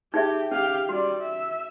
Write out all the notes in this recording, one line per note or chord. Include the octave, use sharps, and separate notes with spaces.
D#4 G4 G#4 E5
C#4 G4 F5
G3 F#4 D5
E5